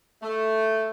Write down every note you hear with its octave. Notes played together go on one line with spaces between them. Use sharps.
A3